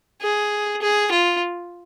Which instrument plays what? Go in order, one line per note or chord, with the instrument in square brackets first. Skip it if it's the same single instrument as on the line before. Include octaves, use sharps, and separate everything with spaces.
[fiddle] G#4
G#4
F4